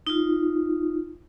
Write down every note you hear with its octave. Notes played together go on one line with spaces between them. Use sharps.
D#4 F4